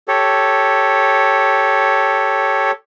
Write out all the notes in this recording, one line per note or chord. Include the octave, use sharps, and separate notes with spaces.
G4 A4 C#5